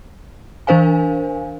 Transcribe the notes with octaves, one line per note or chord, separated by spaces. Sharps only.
E3 D4 A#4 C5 F5 G#5